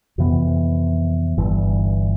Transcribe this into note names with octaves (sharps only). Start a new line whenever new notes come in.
F2 C3 E3 B3
G1 G2 E3